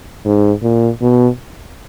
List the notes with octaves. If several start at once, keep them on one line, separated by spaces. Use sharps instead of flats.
G#2
A#2
B2